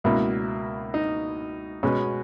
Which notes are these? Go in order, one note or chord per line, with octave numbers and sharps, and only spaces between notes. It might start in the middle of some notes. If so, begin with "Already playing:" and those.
C#2 B2 A#3 E4
D#4
B2 G#3 B3 C#4